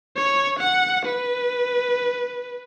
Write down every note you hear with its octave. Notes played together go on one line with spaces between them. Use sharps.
C#5
F#5
B4